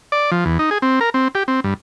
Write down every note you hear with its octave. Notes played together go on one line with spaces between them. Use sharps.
D5
F3
E2
D#4
G#4
C4
A#4
C4
G4
C4
G2